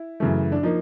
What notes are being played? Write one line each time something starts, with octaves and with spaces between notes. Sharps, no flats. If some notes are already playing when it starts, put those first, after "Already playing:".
Already playing: E4
F#2 C#3 E3 A3
D4
F3 A#3 D#4